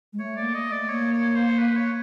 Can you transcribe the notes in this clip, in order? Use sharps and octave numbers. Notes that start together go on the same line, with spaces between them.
G#3
A3 C#5
D5
A#3
A3 D#5
D5
A#3 C#5
C#5
C5
B4
C#5